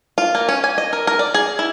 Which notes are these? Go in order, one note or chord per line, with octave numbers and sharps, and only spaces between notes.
F4
A#3
C#4
G#5
D#5
A#4
A#4
D5
G#4
E4